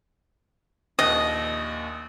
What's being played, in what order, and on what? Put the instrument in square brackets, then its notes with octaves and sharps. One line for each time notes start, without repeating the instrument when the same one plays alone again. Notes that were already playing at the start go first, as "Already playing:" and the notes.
[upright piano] A#1 D#2 F#6 [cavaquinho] D#5